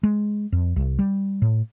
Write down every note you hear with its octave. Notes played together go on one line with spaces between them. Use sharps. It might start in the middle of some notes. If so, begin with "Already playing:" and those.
G#3
F2
C2
G3
A2